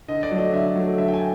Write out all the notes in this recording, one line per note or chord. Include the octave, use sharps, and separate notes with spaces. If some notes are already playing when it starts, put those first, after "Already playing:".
D3 D#5
D5
F#3 A3
D#5
D3 E5
F#3 A3
D3 E5
G5
G#5